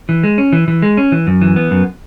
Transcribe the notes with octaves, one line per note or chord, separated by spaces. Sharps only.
E3
G#3
C#4
E3
E3
G#3
C#4
E3
F#2
E3
B3
F#2